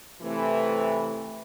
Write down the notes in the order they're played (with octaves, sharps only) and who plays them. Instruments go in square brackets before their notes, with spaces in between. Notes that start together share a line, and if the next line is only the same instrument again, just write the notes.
[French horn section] C3 E3 A3